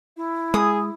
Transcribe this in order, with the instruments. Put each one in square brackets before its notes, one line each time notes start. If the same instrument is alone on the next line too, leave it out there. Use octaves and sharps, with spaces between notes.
[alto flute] E4
[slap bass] G#3 [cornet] G#4 [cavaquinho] D#6